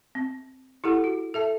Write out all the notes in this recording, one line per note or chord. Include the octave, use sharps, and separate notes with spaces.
C4
E4 G4 A4 F#5
F#4
A4 E5 A5